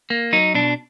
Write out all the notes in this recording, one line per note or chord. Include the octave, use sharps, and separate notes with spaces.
A#3
F#3 D#4
B2 D4